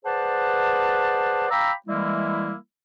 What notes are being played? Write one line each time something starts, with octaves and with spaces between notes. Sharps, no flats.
G#4 B4 C5 D5 F#5 A5
F5 G5 A#5 B5 D6 E6
E3 G3 G#3 A#3 E4